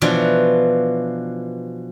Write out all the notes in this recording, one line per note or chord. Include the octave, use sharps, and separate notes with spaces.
B2 E3 F3 D4 F4 F#4